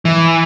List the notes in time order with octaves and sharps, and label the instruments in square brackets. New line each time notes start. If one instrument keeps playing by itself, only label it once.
[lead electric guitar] E3